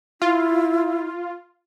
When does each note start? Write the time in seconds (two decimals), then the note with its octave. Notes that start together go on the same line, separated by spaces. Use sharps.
0.22 E4 F4